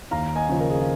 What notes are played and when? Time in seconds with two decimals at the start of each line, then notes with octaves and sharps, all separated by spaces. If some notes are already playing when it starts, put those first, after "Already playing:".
0.11 D#2 F5 A#5
0.36 D#5 G#5
0.49 C#3 F3
0.60 A#4
0.70 G#4
0.79 F4